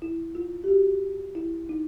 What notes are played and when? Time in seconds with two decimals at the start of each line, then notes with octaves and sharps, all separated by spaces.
0.02 E4
0.35 F4
0.64 G4
0.68 F#4
1.35 E4
1.69 D#4